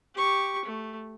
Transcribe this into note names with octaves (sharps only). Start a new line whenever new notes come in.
G4 C#6
A3